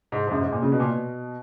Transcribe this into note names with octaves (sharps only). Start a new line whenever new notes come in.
G#2
G#2
F#2
G#2
A#2
C#3
B2
A#2
B2